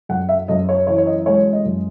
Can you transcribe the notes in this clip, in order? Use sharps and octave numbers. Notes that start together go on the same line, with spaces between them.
F#2 F#5
E5
F#2 D#5
C#5
E3 C#5
C#5
D#5
G#3 C#5
D#5
F#2